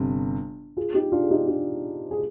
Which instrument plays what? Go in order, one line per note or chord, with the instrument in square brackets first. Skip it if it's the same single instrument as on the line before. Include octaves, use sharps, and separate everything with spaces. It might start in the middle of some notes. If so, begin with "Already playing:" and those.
Already playing: [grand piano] G1 C3
[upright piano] F4 G#4
D#4 G4
D4 F4
G#4
D#4 G4
D4 F4
G#4